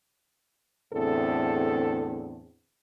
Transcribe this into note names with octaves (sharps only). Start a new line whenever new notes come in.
E2 A2 D3 C4 G#4 A4